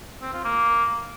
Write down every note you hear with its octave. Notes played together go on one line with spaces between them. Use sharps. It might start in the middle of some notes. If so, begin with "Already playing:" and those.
C4
F4
A#3